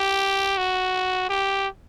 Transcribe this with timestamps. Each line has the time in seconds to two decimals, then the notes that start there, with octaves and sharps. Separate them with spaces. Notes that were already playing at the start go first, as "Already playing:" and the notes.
Already playing: G4
0.58 F#4
1.30 G4